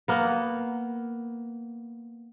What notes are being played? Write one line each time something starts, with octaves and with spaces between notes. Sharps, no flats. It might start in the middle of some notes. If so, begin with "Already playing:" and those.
A#3 B3